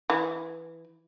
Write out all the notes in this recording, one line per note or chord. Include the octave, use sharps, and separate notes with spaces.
E3